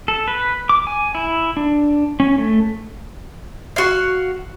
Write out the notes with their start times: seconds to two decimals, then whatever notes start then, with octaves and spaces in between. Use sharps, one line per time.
0.08 A4
0.28 B4
0.69 D6
0.87 G#5
1.15 E4
1.57 D4
2.20 C#4
2.38 A3
3.76 F#4 F5